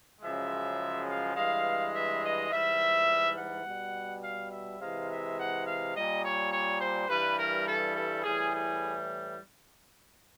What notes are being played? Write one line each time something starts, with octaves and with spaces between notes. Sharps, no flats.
F#2 C#3 F3 G#3 E5
F5
G2 E3 G#3 F5
E5
D#5
G#2 E3 G3 E5
F#5
B2 G3
F5
E5
C3 E3 G#3 F5
E5
F#5
F5
A#2 G3 D#5
C#5
C#5
C5
G2 E3 G3 B4
A#4
A4
A4
A2 E3 G3 G#4
G#4